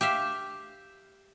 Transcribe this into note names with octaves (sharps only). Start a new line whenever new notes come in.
G4 E5 F5